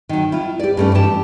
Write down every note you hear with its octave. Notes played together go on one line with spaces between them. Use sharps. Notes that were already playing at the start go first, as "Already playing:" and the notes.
D#3 F#3
E4 F4
G4 D5
G2 A3 C#4
E3 G4 A5